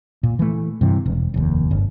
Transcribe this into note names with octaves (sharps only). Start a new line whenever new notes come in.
A#2
E3 A3
G2 C3 E3
E1
F1 D#2
G1